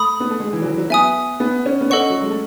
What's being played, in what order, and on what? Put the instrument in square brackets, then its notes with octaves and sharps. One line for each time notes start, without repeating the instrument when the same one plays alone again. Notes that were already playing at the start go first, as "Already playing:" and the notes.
Already playing: [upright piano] A3 [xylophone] B5 D#6
[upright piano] B3
A3
G#3
E3
F#3
E3
F#3
[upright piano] B3 [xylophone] E5 G#5 D#6
[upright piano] B3
C#4
B3
[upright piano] C#4 [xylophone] A4 D#5 F#5 C#6
[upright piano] F#3
G#3
A3